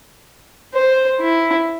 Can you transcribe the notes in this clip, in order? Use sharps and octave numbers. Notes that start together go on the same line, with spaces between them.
C5
E4